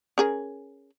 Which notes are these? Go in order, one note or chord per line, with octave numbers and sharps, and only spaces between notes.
C#4 G#4 A#4